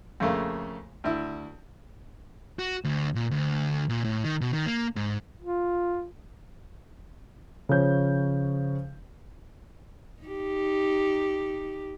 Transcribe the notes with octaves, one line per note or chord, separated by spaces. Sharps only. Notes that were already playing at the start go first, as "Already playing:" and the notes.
F2 C#3 A3 A#3
D2 E4
F#4
D2
A#2
D2
A#2
A2
D#3
B2
D#3
A#3
G#2
F4
C#3 F3 C#4 G6
D#4 G4